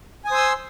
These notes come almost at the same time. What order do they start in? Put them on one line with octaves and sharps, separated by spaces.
G#5 D#6 C5 E6 C6